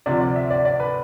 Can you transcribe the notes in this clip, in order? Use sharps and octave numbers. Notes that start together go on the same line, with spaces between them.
D2 C3 F3 D5
D5
E5
D5
D5
B4